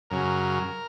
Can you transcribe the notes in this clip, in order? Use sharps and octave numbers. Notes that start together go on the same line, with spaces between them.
F#2 C#3 F#3 A#4